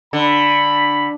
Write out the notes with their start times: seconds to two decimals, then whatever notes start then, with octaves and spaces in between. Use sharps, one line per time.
0.13 D3 B5